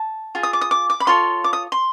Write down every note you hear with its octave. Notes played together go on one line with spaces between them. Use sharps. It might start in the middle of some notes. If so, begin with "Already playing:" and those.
Already playing: A5
F4 G#4
D#6
D6
D#6
D6
D6
B5
F4 A4 C#5 C6
D6
D#6
C6